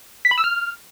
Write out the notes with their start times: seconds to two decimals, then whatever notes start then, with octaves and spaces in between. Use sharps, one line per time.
0.25 B6
0.31 B5
0.38 E6
0.44 F6